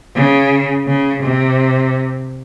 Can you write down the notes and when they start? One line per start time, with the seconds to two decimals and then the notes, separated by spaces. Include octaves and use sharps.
0.15 C#3
0.87 C#3
1.23 C3